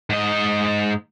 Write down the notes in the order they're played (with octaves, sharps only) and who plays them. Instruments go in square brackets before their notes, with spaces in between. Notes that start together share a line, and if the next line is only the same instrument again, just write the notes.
[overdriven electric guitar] G#2 D#5